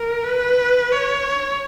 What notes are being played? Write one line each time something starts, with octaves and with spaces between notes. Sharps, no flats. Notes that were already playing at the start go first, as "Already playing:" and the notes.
Already playing: A#4
B4
C#5